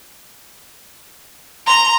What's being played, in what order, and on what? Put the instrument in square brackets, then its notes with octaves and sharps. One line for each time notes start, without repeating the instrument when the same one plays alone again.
[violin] A#5 [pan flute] C6